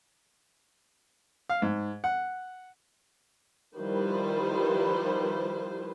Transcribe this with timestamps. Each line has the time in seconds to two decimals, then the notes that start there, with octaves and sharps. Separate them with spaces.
1.49 F5
1.62 G#2
2.04 F#5
3.77 D#3 F3 G3 E4 B4 C5